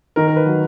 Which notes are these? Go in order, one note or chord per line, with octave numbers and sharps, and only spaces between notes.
D#3 A#4
A#4
B4
F#3